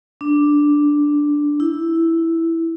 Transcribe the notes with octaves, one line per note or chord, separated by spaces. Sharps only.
D4
E4